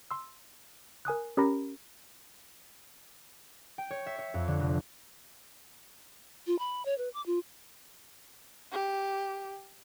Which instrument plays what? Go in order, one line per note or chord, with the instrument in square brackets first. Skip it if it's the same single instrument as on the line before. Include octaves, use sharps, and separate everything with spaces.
[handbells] C6 E6
A#4 G#5 D#6 F#6
C#4 G4 A#4 A#5 B5 A#6
[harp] G5
C#5
E5
C#5
F2
D3
F1
[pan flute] F4
B5
C#5
B4
D6
F4
[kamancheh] G4